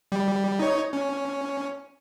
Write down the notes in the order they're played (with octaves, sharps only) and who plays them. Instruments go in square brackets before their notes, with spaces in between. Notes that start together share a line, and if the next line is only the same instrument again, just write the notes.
[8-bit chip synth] G3
D#4 C#5
C#4